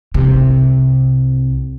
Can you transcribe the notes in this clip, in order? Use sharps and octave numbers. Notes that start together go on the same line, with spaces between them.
C2 C3